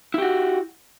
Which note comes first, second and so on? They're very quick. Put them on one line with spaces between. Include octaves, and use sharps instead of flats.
E4 G4 F#4